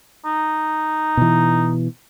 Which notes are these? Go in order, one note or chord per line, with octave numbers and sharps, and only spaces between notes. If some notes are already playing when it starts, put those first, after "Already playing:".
D#4
B2 E3